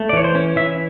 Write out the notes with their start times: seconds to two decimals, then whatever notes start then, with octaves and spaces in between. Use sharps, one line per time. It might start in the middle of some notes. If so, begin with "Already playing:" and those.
Already playing: A3
0.09 D5
0.13 E3 C#5
0.24 C5
0.35 C#4
0.56 E3 E5